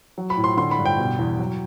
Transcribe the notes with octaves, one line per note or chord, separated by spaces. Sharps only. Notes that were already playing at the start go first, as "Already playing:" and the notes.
F#3
B5
A2
C6
D3 C6
B5
G2
G5
B2
E2
F#3